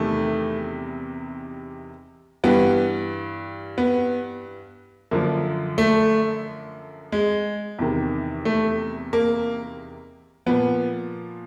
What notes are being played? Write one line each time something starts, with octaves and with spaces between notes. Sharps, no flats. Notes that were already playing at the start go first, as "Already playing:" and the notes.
Already playing: E2 C3 D#3 G3 A3
G2 E3 G3 B3
B3
F#2 D3 F3 A#3
A3
G#3
E2 C3 D#3
A3
A#3
A#2 F3 B3